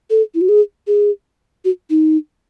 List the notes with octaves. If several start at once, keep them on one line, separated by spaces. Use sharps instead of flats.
A4
E4
F#4
G#4
G#4
F#4
D#4